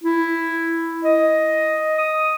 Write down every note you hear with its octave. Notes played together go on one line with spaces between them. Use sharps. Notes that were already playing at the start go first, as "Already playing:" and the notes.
E4
D#5
D#6